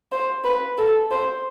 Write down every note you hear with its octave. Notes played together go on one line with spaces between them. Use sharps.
C5
B4
A4
C5